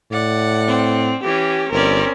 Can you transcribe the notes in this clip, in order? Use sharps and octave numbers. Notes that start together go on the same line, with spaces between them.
A2 D5 F#5
C4
E3 C#4 G4
G1 C4 C#4 A#4 D5